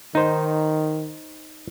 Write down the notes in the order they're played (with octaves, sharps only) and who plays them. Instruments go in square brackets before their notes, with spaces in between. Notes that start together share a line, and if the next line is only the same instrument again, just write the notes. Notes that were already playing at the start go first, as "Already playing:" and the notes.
[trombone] D#3 [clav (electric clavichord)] D#4 C5